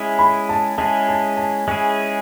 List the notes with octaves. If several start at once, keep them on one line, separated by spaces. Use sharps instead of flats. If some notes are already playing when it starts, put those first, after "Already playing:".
Already playing: G#3 C#4 E4 G#4
B5
A5
G#3 C#4 E4 G#4 A5
A5
A5
G#3 C#4 E4 G#4 G#5